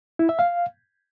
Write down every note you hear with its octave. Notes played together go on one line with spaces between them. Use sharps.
E4
E5
F5